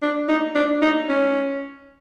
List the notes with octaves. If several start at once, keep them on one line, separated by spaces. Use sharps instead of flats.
D4
D#4
D4
D#4
C#4